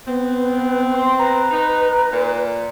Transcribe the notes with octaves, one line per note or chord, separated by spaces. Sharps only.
B3 C4
C6
B4 A#5
D#4
A#2